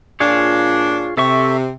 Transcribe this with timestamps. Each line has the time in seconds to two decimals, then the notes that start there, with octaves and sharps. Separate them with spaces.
0.20 A#2 D4 F4 G#4 C#5
1.17 C3 A4 E5 C#6